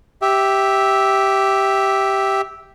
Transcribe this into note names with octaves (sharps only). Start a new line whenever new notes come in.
G4 E5